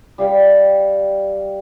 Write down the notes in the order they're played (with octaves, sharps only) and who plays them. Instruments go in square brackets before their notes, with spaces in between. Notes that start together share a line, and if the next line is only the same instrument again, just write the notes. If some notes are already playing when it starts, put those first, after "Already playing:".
[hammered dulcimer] G3 F5 G5